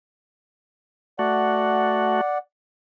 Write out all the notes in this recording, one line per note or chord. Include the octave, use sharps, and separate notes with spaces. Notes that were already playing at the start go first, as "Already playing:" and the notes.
A3 F#4 D5 F#5